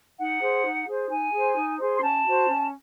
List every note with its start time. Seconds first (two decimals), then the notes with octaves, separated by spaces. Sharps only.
0.18 D#4 F#5
0.41 G#4 C5
0.64 D#4
0.86 G#4 C5
1.10 D#4 G#5
1.33 G#4 C5
1.55 D#4
1.79 G#4 C5
1.96 C6
2.01 C#4 A5
2.24 F#4 C5
2.48 C#4